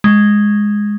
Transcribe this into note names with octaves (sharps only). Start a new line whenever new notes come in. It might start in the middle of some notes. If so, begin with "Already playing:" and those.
G#3